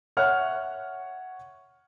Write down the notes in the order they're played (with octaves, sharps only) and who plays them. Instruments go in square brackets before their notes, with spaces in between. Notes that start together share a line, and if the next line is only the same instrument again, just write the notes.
[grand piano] C#5 E5 F#5 F6 F#6